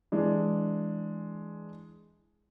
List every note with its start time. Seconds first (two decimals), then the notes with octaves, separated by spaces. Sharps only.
0.12 E3 G#3 D4